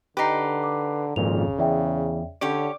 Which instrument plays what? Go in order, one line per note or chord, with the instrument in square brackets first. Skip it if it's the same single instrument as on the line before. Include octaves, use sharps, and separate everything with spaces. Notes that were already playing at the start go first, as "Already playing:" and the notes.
[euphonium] D3 [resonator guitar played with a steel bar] D#4 G4 [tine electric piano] B4 C7
[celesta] D6
[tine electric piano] G#1 F2 A#2 [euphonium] C#3 [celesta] F7
[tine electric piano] E2 [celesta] D5 E5 G5
[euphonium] D3 [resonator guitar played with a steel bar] C#4 G4 C#5 [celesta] D5 [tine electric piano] D6